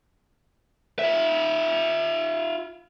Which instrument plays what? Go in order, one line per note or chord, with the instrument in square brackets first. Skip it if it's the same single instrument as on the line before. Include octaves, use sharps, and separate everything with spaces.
[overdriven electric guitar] F4 E5